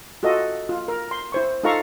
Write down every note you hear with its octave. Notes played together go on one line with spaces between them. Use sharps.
F4 F#4 A4 D#5
F4
A#4
C6
E4 C5 C#6
D#4 F4 A4 F5 A#5 C#6